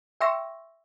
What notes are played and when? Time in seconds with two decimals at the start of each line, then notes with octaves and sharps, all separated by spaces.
0.21 E5 G5 C6 C#6 E6 A#6